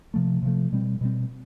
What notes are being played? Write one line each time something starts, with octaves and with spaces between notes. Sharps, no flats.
C3 F3 A3
C3 F3 A3
B2 G3 C4
B2 G3 C4